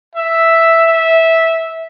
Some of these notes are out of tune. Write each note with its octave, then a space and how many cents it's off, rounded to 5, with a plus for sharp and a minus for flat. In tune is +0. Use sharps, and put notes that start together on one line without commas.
E5 +0
E5 -10